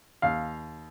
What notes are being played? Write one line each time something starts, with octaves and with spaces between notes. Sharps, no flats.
D#2 F5